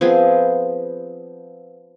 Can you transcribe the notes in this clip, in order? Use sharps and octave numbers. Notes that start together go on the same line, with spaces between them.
F3 B3 C4 G#4